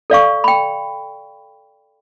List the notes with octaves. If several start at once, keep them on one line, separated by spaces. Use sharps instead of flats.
A4 D5 F5 C#6
G5 B5